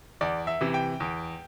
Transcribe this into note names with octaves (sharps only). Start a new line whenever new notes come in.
E2 D5
E5
C3 E3
G5
E2